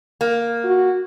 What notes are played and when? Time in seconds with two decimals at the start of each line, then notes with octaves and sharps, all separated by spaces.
0.21 A#3
0.64 F#4